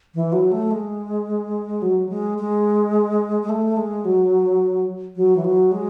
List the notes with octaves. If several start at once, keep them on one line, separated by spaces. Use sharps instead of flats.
E3
F#3
A3
G#3
F#3
G#3
G#3
G#3
A3
G#3
F#3
F#3
E3
F#3
G#3